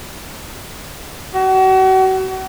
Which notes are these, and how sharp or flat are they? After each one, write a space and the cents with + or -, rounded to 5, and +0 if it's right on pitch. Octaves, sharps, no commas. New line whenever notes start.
F#4 +35